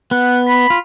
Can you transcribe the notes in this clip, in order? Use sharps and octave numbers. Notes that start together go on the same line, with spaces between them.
B3 F#5
B5
F4